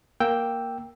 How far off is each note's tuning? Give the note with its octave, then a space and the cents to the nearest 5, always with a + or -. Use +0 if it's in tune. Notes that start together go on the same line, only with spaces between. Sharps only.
A#3 +0 G5 +0 E6 +0